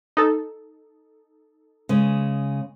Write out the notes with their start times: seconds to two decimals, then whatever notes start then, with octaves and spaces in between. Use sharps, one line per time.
0.17 D#4 A4
1.89 C#3 G#3